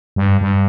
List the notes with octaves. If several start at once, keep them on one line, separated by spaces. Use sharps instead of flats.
G2
G2